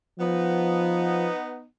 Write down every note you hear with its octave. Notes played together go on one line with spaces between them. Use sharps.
F3 B3 D#4